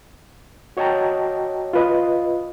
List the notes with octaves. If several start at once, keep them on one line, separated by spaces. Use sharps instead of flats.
F#4 C#5 D#5 G5 A5 A#5
F4 B4 D#5